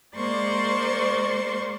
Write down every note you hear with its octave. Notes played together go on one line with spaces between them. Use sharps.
G#3 A#3 C5 D5 C6 C#6